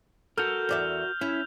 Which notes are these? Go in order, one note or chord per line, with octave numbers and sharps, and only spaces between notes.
F#4 A4 A#4 F6 G6 F7
E2 D5 E5
C#4 E4